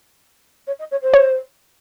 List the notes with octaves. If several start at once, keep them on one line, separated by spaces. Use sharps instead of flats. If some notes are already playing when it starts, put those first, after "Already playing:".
C#5
D#5
C#5
C5
C#5